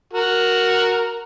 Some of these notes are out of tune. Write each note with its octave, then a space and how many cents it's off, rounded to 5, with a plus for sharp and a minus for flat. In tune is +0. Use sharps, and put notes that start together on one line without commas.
F#4 +0 A#4 +0